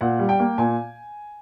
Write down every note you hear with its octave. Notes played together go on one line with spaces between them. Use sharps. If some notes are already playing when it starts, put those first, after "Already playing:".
A#2 F#5
G3
G5
A#3
A#2 G#5